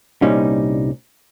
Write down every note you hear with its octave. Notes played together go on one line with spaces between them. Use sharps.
C2 A#2 G3 C#4 D#4